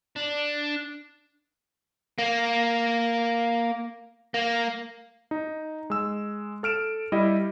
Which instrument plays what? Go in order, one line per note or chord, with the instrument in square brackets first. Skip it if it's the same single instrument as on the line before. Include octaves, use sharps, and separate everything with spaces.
[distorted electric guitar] D4
[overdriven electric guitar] A#3
A#3
[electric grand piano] D#4
G#3 E6
A4 F6 D7 E7
G3 E4 D#5